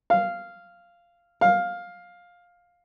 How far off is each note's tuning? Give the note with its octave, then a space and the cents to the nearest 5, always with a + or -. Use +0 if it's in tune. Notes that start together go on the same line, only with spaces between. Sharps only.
F5 -10
F5 +10